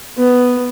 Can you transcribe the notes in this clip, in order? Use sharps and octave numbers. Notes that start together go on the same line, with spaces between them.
B3